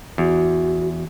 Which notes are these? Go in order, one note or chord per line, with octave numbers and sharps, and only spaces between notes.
E2 F#4